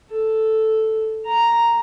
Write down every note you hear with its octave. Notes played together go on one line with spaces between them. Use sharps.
A4
A#5